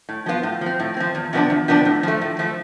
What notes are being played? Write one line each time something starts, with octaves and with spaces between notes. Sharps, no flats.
A2
F3 B3 F4
A2
F3 C4
A2
F3 C4
E2
C3 F3 B3 D4
E2
C3 F3 B3 D4
A2
F3 A3
A2
F3 A3